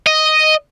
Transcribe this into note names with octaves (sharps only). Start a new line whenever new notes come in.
D#5